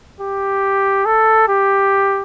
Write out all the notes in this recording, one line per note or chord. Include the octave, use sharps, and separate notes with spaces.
G4
A4
G4